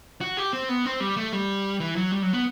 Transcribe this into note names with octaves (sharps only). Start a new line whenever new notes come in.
F#4
G4
C4
B3
C4
G3
A3
G3
E3
F#3
G3
F#3
B3